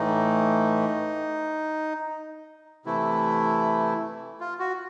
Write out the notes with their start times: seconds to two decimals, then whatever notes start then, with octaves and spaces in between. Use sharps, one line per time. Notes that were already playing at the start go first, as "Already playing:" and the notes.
Already playing: A2 E3 A3 D#4
2.85 C3 E3 A3 E4
4.40 F4
4.59 F#4